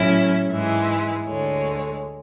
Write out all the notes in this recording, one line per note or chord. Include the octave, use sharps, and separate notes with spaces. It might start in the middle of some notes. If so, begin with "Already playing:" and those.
Already playing: A2 F#3 C#4 E4
G#2 E3 G#3 E5
D2 D3 G#3 C#5